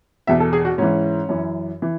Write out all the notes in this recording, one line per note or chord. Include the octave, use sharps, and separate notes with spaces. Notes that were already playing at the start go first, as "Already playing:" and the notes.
E2 B2 E5
A4
G#4
F#4
G#2 E3 C#4
F#2 E3
E3